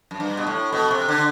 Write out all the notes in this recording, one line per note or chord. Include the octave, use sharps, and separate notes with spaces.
F#2
G2
B2
A2
B2
C3
D3